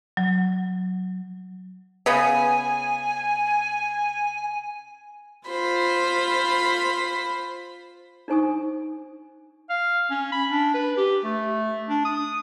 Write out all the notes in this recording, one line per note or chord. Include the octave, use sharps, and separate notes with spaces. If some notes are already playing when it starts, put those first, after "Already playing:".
F#3
C#3 B3 G#5
F4 C5 B5
D4 D#4 C5 G#5 C#6 D#6
F5
C#4
B5
D4
B4
G4
A3
D4
D#6